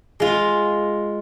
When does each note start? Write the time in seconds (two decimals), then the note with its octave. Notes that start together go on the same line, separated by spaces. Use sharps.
0.20 G#3 F4